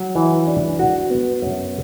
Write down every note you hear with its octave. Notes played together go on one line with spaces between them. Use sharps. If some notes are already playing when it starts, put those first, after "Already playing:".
Already playing: F#3
E3
D4
F#4
B3
F#2